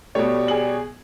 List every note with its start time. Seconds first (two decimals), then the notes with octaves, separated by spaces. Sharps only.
0.15 B2 G3 A3 C#5
0.48 G#4 F#7